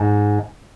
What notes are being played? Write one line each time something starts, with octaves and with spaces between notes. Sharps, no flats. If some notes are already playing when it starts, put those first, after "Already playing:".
Already playing: G#2